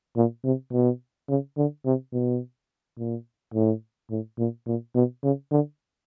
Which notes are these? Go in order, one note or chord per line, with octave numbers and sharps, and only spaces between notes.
A#2
C3
B2
C#3
D3
C3
B2
A#2
A2
A2
A#2
A#2
B2
C#3
D3